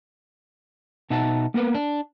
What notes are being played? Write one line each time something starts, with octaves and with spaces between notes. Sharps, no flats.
B2 D#4 E5 F#5 A5
A#3 B3 A#4 B4
D4